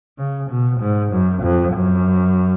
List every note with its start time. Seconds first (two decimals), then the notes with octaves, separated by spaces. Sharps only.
0.18 C#3
0.50 B2
0.81 G#2
1.12 F#2
1.43 F2
1.74 F#2